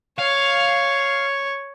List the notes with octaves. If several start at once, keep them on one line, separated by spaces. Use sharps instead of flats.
C#5 F5